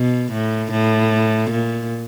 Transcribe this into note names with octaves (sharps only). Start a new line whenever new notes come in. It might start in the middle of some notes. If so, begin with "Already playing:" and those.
Already playing: B2
A2
A2
A#2